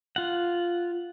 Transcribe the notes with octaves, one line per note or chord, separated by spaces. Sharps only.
F4 F#5